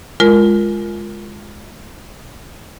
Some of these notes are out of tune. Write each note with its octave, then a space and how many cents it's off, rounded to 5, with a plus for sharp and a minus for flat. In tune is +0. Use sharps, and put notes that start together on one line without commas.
G#3 +0 F4 +0 A#4 +0